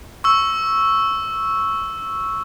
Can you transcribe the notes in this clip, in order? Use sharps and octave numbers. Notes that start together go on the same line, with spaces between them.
C#6 E6